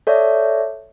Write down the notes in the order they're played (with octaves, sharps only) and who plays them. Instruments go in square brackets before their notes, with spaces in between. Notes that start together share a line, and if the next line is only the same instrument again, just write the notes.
[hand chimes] A4 C#5 D5 E5